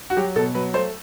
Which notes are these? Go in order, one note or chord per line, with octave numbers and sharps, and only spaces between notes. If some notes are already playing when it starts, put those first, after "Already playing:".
F#4
F#3 G4
B2 A4
F#3 B4
A3 C5